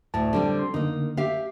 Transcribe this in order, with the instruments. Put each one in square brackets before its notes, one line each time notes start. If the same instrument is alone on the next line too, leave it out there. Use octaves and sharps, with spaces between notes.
[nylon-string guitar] D2 A2 [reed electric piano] A5
[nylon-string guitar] D3 G3 C4
[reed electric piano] C6
[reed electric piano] D3 [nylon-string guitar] A#3 D#4
[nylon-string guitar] G4 E5 F5